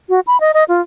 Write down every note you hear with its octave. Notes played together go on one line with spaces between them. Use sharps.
F#4
B5
D#5
D#5
F4